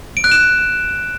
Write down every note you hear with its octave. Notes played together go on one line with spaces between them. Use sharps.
D7
F#6
E7